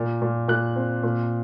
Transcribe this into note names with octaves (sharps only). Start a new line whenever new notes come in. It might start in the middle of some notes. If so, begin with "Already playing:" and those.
Already playing: A#2
A#2
A#2 F#6
C4
A#2